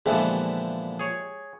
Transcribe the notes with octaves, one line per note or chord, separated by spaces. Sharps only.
A#2 D3 E3 F3 G#3 B3 G4 E5
G#4 C#5